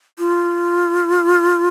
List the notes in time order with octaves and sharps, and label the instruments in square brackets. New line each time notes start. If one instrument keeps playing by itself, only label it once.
[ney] F4